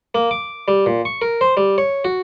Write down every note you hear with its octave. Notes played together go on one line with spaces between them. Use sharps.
A#3
D6
G3
A#2
C#6
A#4
C5
G3
C#5
F#4